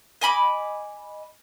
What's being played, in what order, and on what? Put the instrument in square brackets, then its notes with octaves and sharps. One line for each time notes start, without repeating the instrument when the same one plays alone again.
[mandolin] D#5 G#5 B5 D6